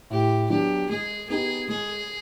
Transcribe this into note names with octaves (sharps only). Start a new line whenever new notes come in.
A2 G4
F#3 B3 D4 G4
G#3 G#4
B3 D#4 G4 G#4
G#3 G#4